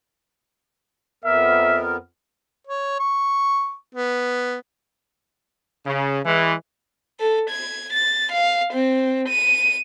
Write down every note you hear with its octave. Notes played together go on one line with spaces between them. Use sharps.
F2 B3 A#4 E5
C#5
C#6
B3
C#3
E3 G#3
A4
G#6
A6
F5
C4
D#7